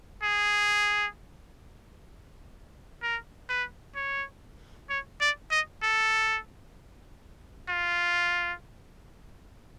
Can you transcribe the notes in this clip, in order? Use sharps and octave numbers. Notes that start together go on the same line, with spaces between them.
G#4
A#4
B4
C#5
C#5
D5
D#5
A4
F4